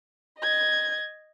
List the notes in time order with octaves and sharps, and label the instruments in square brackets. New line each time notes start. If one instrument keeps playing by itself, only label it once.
[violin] D#5 G#6